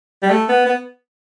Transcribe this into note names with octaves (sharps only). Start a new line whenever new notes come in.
G3
A3
B3
B3